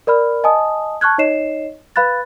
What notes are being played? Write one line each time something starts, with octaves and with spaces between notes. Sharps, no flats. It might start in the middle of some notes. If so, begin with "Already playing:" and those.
A#4 D5 B5 F6
D#5 G#5 A5 D#6
A5 C#6 F6 F#6 G#6
D#4 C#5 D#5 C7 E7
B4 F5 B5 F#6 A6